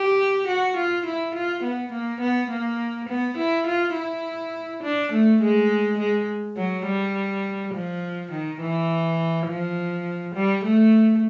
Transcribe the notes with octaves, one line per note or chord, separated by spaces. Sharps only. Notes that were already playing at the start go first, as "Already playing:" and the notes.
Already playing: G4
F#4
F4
E4
F4
B3
A#3
B3
A#3
B3
E4
F4
E4
D4
A3
G#3
G#3
F#3
G3
F3
D#3
E3
F3
G3
A3